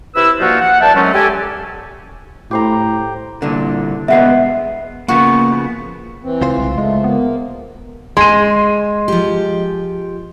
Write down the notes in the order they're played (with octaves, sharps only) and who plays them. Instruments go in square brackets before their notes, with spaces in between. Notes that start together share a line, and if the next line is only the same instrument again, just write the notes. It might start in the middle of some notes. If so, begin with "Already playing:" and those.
[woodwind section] C3 E4 B4 E6
G2 F3 A#3 D#4 F4 F#4
F#5
E2 D5 E5 G5 A5
D#3 F#3 G#3 A3 C4 C#4
G4 A4 G#5
[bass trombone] A2 [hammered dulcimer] G4 C5 A#5
[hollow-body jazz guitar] C2 A#2 D3
[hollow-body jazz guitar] B2 G#3 B3 [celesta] E5 F#5 C7
[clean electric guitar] C#3 F3 B3 [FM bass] A#3 [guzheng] F#4
[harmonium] E3 C4
[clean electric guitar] C#2 F4 C5
[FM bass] C2
[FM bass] G#3 [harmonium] A3
[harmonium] A#3 [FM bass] B3
[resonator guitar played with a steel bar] G#3 [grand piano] C6 D#7
[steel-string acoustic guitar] F3 G4